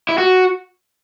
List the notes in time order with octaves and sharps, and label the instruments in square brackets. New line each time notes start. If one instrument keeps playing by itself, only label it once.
[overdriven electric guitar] E4
F#4